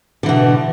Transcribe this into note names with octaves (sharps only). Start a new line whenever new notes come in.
B2 D3 E3